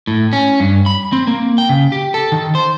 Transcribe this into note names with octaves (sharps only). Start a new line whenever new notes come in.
A2
C#4
G2
B5
C4
A#3
G5
C#3
G4
A4
D#3
C5